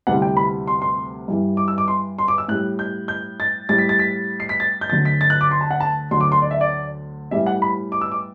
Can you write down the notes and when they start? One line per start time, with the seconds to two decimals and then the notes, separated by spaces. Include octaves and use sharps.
0.07 D2 C3 E3 G3 F#5
0.22 G5
0.37 B5
0.67 C6
0.82 C6
1.28 G2 E3 G3
1.57 D6
1.68 E6
1.78 D6
1.88 C6
2.18 C6
2.28 D6
2.38 E6
2.48 A2 G3 F#6
2.79 G6
3.08 G6
3.40 A6
3.69 A2 G3 A6
3.78 B6
3.89 A6
3.99 B6
4.40 C7
4.49 B6
4.60 A6
4.81 G6
4.90 D2 D3 F#3 A6
5.05 B6
5.21 A6
5.30 F#6
5.41 D6
5.51 C6
5.61 A5
5.71 F#5
5.80 A5
6.11 D2 D3 F#3 C6
6.21 D6
6.32 C6
6.42 D5
6.51 E5
6.61 D5
7.31 A2 E3 G3 E5
7.46 F#5
7.62 B5
7.92 D6
8.01 E6
8.12 D6